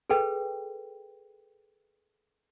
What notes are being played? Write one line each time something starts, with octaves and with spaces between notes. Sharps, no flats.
G#4 A4 B4 G5